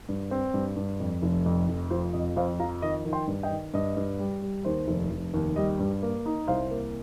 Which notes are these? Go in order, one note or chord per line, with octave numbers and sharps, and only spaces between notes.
G2
C4
G2
G2
F2
F1
F2
F1
F3 C5
F2 D#5
F2 C5 F5
F3 F5 A#5
D#3 D#5
D#3
G5 C6
G2
D#5 G5
D#3
G2 D#5
G2
G3
G3
D#2 C5
F1
F1
D#2
G3 D#5
G2
A#3
D#4
C2 C5 F5
A#3